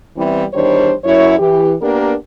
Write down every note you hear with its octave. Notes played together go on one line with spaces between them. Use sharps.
E3 G3 B3 C4 E4
E2 D#3 G3 D4 C5 C#5
F#2 E4 C#5
E3 G4
A#3 B3 D4 G4 A#4